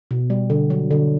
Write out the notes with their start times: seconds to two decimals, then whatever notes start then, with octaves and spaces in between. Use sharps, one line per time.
0.11 B2
0.30 G3
0.50 D3
0.70 F#3
0.91 D3